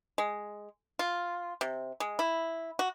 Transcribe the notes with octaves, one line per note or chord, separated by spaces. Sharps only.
G#3
F4
C3
G#3
E4
F#4